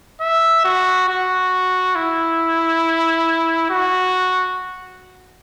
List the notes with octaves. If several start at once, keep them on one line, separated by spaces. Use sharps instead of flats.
E5
F#4
F#4
E4
F#4